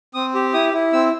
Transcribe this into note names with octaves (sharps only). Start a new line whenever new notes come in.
C4 D#6
G4
E4 D#6
E4
C4 E6